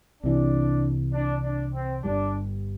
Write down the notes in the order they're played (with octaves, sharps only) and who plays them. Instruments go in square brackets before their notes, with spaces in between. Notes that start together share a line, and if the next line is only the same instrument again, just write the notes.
[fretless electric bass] C2 C3 E3 [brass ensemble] D4
[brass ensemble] D4
D4
C4
[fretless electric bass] G1 G2 G3 [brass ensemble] D4